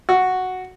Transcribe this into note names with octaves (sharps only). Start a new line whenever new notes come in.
F#4